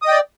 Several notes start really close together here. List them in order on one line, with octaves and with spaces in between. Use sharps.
D#6 D#5 G5 D5